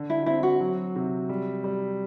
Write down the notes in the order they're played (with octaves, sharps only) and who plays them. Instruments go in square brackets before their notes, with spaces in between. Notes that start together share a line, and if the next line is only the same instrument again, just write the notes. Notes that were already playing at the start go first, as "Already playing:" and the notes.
Already playing: [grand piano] D3
[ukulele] E4
[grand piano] C4 [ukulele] E4
[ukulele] F#4
[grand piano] F#3
C3
G3
G3